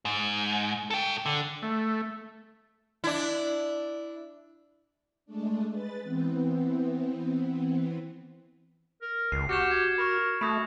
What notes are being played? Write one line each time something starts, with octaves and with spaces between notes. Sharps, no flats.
G#2
A4 G5
D3
A3
D4 E4
G#3 A3 D4
G#3 B4 A6
E3 B3 C4
A#4
C#2 C7
F#4 G4 F6 C#7 E7
G#6
A#4 B5 C#6
A3 F#4 B5 D#6